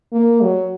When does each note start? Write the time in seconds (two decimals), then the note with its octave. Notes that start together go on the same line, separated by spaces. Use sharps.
0.13 A#3
0.41 F#3